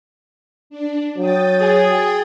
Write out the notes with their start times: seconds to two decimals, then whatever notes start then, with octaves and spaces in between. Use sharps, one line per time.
0.70 D4
1.18 F#3 G5 D#6 A6
1.61 G#4